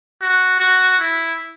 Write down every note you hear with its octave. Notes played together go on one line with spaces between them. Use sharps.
F#4
F#4
E4